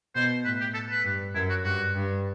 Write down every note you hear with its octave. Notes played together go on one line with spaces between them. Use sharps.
B2 C5
A2 B4
G4
A4
B4
G2
F#2 E4
F#4
G2 F#4
G2